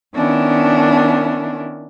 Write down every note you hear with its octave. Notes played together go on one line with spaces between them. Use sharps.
D#3 B3 C#4 D4 E4